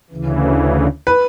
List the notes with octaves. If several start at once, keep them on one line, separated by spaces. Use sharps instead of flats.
D2 C#3 E3
B4